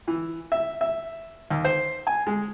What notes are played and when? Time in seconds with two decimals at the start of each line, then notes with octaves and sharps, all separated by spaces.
0.08 E3
0.52 E5
0.81 E5
1.50 D#2
1.65 C5
2.07 G#5
2.27 G#3